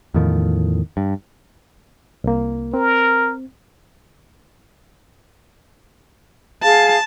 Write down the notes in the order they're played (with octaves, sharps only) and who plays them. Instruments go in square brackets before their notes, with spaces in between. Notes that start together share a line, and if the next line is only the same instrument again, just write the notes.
[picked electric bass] E2 A2 D#3 F3
G2
[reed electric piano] C2 A#3
[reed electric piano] C4 [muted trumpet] A#4
[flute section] G#4 F5 [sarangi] A5